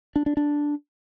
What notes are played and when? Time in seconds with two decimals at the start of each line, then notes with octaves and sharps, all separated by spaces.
0.16 D4
0.26 D4
0.37 D4